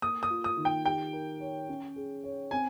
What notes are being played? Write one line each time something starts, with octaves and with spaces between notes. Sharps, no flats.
A#3 D#6
D#6
F4
D#6
D#3
G5
G4 G5
A#4
C#5
C#4
G#4
C#5
C4 G#5